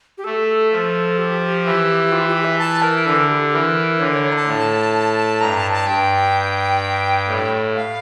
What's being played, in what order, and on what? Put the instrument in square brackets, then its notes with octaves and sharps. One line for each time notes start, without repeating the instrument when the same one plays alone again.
[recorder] G4
[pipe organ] A3 [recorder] A4
[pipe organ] F3
[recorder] G4
[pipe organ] E3
[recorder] F4
G4
E5
A5
A#4
[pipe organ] D3 [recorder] A4
[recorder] G4
[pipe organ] E3 [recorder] A#4
[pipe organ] D3 [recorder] C#5
[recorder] C#5
C#5
A#5
A5
[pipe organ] A2
[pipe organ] G2 [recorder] A#5
[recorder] A5
A5
[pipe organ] G2 [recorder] G5
[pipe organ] A2
[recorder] F5